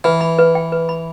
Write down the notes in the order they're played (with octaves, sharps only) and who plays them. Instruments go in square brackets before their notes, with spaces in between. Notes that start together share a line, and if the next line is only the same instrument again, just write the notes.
[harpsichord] E3 [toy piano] B4
[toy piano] B5
B4
G5
B4
B5